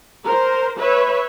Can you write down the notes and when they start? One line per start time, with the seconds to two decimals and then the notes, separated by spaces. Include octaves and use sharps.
0.24 A#4 C5
0.79 B4 C#5 E5